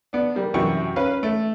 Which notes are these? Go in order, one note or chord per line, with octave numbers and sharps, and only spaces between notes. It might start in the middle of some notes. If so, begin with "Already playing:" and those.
B3 D4
G3 A#3
F#2 C3 E3 G5 C#6
C#4 B4 F5
A3